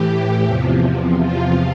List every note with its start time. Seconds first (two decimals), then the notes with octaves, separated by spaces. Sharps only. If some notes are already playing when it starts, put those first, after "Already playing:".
Already playing: A2 E3 G4
0.45 E2 C3 F3
1.22 E2 C3 F3 F4